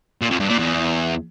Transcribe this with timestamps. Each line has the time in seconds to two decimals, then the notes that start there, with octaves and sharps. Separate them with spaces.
0.21 A#2
0.31 F2
0.40 G2
0.49 A#2
0.58 E2